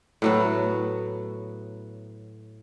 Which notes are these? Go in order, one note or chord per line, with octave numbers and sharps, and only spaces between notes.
A2 F#3 B3